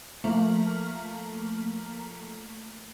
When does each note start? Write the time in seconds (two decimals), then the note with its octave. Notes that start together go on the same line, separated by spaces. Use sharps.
0.24 F3 A3 A#3 A#5 F6 F#7